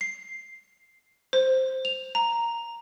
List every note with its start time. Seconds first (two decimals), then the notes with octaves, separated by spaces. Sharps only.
0.01 C7
1.33 C5
1.85 F7
2.15 A#5